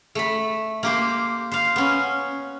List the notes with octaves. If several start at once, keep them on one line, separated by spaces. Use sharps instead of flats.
A3 B5
A#3 G4 C5
C5 F5
B3 C#4